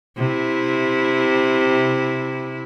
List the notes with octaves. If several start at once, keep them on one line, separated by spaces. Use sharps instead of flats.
C3 E4